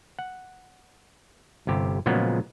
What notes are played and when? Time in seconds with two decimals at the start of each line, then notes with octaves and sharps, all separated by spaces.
0.19 F#5
1.67 G1 C3 G4
2.06 A#2 C#3 F3 F#3 G#3 B3